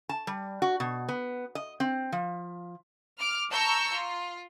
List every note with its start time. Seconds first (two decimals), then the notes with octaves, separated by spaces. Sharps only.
0.09 A5
0.27 G3
0.62 F#4
0.80 B2
1.09 B3
1.55 D#5
1.80 C4
2.12 F3
3.19 D6 F6
3.50 A5 A#5 C#6 E6 G6
3.93 F4